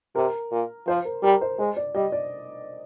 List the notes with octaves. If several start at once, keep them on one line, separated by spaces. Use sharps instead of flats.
C3 A#4
A#2
F3 C5
A#4
G3 A#4
C5
G#3 C5
D5
G3 D#5
D5